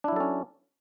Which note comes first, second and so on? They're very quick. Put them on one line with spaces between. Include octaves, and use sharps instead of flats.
D4 E4 F#3 A4 C#4